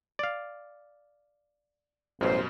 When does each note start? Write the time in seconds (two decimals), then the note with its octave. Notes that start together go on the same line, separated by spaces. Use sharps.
0.19 D5 F5
2.21 A1 F#2 B2 G3 C5